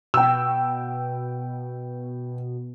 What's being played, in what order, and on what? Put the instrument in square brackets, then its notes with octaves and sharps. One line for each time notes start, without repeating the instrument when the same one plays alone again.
[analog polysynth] B2 [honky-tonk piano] G5 E6